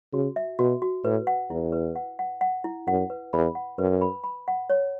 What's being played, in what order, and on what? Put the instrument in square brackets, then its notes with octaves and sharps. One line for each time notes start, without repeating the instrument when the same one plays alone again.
[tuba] C#3 [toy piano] F#4
[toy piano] E5
[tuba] B2 [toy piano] F#4
[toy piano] F#4
[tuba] A2 [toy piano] B4
[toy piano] F#5
[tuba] E2 [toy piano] E4
[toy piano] B4
F#5
F#5
F#5
E4
[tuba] F#2 [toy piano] F#5
[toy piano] B4
[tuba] E2 [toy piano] B5
[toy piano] F#5
[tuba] F#2 [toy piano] B4
[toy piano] B5
B5
F#5
C#5